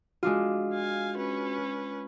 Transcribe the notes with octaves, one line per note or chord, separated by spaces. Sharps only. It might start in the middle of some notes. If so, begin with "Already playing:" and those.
G#3 D4 F4 F#4
F5 G#5
C#4 B4